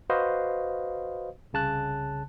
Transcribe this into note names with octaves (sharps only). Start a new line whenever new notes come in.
F#4 B4 C5 D#5 F5
C2 C#3 A5 F#6